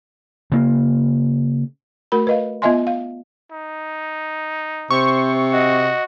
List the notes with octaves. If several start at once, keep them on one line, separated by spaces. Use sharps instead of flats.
C#3 A#3
A3 F#4 A#4 B5
B4 D#5 F5
B3 F4 D#5 E5 G#5 C6
F5
D#4
C3 C5 C#6
F#4 D#5